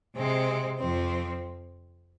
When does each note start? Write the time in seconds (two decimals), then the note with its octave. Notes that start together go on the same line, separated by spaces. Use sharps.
0.15 C3 G#3 C4
0.78 F2 F3 C4